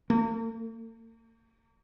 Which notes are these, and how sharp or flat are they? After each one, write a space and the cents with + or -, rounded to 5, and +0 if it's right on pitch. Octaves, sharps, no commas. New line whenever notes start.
A#3 -45